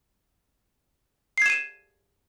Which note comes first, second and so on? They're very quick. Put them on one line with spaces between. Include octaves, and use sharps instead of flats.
C7 G#6 E7 D#7